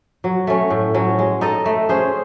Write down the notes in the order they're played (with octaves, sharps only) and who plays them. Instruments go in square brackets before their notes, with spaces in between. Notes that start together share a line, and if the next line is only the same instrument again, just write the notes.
[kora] F#3
A3 C#4
A2
F#3 C#4
G#3
D#4 A4 D#5
A3
C#4 G#4 C5